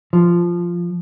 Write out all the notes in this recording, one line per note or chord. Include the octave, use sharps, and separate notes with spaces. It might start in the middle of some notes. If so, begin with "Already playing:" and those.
F3